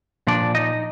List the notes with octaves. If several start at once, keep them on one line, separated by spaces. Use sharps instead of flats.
A#2 F3 D4 D5
D#4 D#5